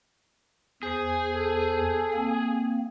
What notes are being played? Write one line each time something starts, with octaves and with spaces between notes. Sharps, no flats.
E2 G#4 C5
A4
A#3 C4